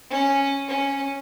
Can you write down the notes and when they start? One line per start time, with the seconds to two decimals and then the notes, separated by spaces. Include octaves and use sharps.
0.10 C#4
0.68 C#4